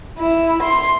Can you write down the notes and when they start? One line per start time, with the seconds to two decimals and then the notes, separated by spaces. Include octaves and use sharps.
0.19 E4
0.63 C6